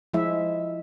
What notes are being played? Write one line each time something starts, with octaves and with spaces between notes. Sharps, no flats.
F3 G#3 E4 E5